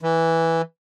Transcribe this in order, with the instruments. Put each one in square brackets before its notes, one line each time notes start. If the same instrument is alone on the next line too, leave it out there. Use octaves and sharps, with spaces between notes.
[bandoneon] E3